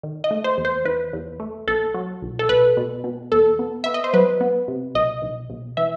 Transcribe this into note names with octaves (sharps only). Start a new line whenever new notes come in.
D#3
D#5
A3
C5
E2
C5
E2 B4
E2
A3
B1 A4
F#3
B1
A4
B1 B4
B2
B2
E2 A4
B3
B3 E5
D#5
C5
F#3 B4
B3
C3
B1 D#5
B1
B1
E3 E5